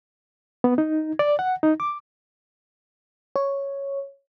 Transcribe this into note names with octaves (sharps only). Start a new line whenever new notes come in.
B3
D#4
D5
F#5
D#4
D6
C#5